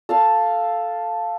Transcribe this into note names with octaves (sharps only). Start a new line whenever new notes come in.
A4 F5 A5